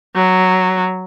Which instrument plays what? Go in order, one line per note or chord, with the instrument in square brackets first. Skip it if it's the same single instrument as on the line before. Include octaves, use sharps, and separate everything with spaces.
[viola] F#3